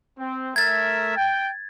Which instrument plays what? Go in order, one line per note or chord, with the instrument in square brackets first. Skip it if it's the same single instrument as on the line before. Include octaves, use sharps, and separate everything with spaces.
[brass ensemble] C4
[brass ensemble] A3 A#4 E5 [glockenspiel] G#6 A6
[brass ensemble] G5